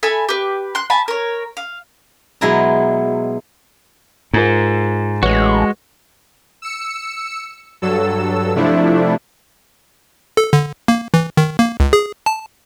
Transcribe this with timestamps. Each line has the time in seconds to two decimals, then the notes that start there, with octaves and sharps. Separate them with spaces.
0.03 A4 E5 G#5 B5
0.29 G4 B4
0.75 C6 F#6
0.90 G#5 A5 B5
1.08 A#4 C#5
1.57 F5
2.41 B2 F#3 G#3 E4 A#4 A#5
4.34 G#2 F4 A#4
5.23 A1 G#3 F#4 B4 C#5
6.62 E6 C#7
7.82 G2 F#3 A4 E6
8.55 C3 F3 A3 D4 E4
10.37 A4
10.53 D3
10.88 A#3
11.14 E3
11.37 D#3
11.59 A#3
11.80 C#2
11.93 G#4
12.26 A5